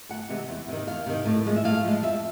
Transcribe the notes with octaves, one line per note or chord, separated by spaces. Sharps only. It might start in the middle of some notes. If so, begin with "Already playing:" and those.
D2 F#5
C3 E3 G#3
E2
C3 D#3
E2 F5
C3 D#3
A2
F3 G#3
E5
A2 F5
F3 G#3
F2 E5